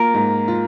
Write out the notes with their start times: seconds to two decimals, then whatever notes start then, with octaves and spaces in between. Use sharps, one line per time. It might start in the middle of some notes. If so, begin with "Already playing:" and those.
Already playing: A#3 F4 A#4
0.14 G#2
0.48 F4